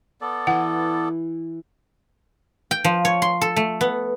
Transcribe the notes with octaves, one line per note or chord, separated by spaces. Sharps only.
B3 A4 D5
E3 E4 F#5
G5
F3
C#5
C6
A4
A3
B3